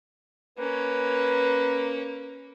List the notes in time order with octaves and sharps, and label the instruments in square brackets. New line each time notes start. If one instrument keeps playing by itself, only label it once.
[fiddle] A#3 C#4 [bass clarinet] B4